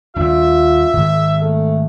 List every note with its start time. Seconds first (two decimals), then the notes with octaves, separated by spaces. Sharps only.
0.16 D#2 G3 D4 F4 E5
0.93 G#2 D#3
1.42 A3